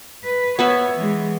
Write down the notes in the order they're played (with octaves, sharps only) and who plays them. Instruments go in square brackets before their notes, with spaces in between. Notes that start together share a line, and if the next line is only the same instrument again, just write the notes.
[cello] B4
[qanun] B3 B4 E5 [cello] C#5
[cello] E3 G#3